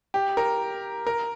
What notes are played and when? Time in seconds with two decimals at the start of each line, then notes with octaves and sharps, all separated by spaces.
0.14 G4
0.37 A#4
1.07 A#4